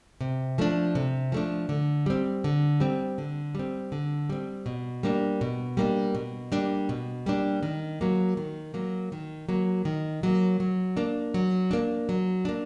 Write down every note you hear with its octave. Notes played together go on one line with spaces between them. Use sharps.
C3
F3 A3 D4
C3
F3 A3 D4
D3
G3 C4
D3
G3 C4
D3
G3 C4
D3
G3 C4
B2
G3 A#3 D4
B2
G3 A#3 D4
B2
G3 A#3 D4
B2
G3 A#3 D4
D#3
F#3 A#3
D#3
F#3 A#3
D#3
F#3 A#3
D#3
F#3 A#3
F#3
A#3 D4
F#3
A#3 D4
F#3
A#3 D4